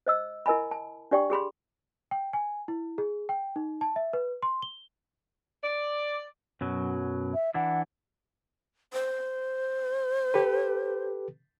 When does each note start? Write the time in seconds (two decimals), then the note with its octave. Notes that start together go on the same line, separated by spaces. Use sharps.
0.07 C5 D#5 E6
0.46 E4 A#4 D#5 G#5 B5
0.71 A5
1.11 D4 G4 D5 G5 C#6
1.30 G4 G#4 B5 C6
2.11 G5
2.33 G#5
2.68 E4
2.98 G#4
3.29 G5
3.56 D#4
3.81 A5
3.96 E5
4.13 B4
4.43 C6
4.62 G7
5.63 D5
6.61 F#2 B2 F#3
7.34 E5
7.54 E3 D4 E4 F#5
8.93 C5
10.34 G4 A4 B4